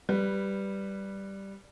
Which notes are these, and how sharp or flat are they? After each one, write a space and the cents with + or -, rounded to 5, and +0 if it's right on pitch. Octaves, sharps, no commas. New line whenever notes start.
G3 +0 B4 +0